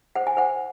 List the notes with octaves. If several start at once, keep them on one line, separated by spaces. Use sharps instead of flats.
C5 F#5
G#5
C5 F#5